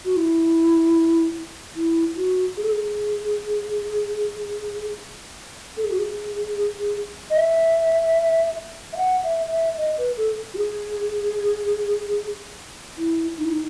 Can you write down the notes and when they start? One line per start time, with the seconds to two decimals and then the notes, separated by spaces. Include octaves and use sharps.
0.05 F#4
0.16 E4
1.76 E4
2.17 F#4
2.57 G#4
2.64 A4
2.72 G#4
5.77 A4
5.84 G#4
5.91 F#4
5.99 G#4
7.30 D#5
7.37 E5
8.93 E5
8.97 F#5
9.24 E5
9.50 E5
9.78 D#5
9.98 B4
10.17 A4
10.54 F#4
10.58 G#4
12.98 E4
13.38 D#4
13.45 E4
13.53 D#4